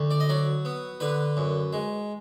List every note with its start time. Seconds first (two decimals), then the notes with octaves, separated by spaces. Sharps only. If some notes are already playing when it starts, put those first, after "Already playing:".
Already playing: D2
0.11 D5
0.20 D#5
0.29 F#3 D5
0.65 B3
1.00 D3 B4
1.37 F#2
1.73 G#3